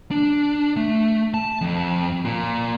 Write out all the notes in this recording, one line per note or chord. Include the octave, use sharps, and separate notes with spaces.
D4
A3
A5
F2
A#2